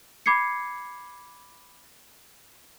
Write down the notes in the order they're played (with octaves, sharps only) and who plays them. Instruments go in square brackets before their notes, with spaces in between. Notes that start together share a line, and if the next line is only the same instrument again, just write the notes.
[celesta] B5 D6 G#6 C7 C#7